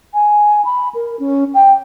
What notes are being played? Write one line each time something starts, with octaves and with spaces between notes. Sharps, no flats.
G#5
B5
A#4
C#4
G5